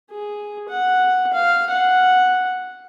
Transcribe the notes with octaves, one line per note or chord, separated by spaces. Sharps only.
G#4
F#5
F5
F#5